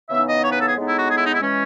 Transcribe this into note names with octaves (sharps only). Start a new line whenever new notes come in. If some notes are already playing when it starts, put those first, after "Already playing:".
C#3 E3 B3 D#4 E5
D#5
C#5
B4
A4
G#4
A2 G#3 B3 D#4
E4
F#4
G#4
E4
D#4
E4
E3 G#3 C#4